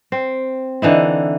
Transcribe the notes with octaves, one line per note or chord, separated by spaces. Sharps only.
C4
D3 E3 D#4 E4